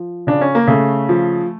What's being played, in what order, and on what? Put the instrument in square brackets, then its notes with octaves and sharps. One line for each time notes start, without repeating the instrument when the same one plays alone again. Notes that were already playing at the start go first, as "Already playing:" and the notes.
Already playing: [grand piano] F3
C#3 D4
C#4
A#3
C#3 A3
F3